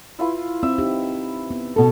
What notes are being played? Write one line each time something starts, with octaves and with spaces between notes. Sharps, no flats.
E4 F4 B4
C4 E5
D#4 G4
B3
B2 A4